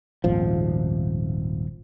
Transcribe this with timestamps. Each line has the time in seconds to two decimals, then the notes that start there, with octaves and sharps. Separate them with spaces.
0.24 D#1 G#1 F3